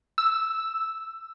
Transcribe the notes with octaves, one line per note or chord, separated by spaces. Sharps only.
E6